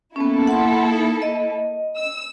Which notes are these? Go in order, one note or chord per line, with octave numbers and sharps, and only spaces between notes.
A#3 B3 C#4 E4 A4
F#5 C6
D#4
D#5
E6